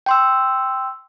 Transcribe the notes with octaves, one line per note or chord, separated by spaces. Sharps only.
G5 C6 E6